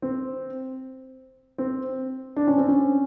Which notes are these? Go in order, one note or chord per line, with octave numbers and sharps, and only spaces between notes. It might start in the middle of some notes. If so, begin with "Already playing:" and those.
C4
C4
D4
C#4
C4
C#4